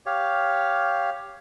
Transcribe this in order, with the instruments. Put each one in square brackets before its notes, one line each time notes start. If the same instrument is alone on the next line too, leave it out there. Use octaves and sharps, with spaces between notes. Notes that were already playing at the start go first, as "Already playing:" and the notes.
[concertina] G4 C#5 F5